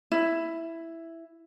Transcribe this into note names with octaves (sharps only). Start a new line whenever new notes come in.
E4